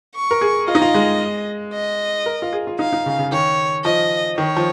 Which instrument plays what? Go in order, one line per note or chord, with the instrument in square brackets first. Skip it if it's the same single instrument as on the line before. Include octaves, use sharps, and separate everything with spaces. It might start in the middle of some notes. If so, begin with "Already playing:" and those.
[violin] C#6
[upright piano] A#4
G#4
[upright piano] F4 [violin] D#5
[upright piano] D#4
F4
G#3
[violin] D#5
[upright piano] A#4
F4
G#4
F4
[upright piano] D#4 [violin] F5
[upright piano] D#4
C#3
C#3
[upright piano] D#3 [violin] C#5
[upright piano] F3 [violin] D#5
[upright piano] D#3 [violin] C#5
[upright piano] F3